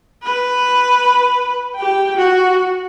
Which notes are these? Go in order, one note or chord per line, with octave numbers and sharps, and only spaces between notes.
B4
G4 G5
F#4